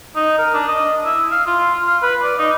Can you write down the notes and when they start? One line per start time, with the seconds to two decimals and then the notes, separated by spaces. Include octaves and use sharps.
0.16 D#4
0.38 A#4
0.54 D4
0.69 D#5
1.05 E4
1.31 F5
1.47 F4
1.87 F5
2.03 B4
2.23 D5
2.39 D#4